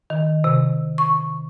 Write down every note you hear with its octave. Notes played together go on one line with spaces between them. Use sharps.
D#3
C3
C#6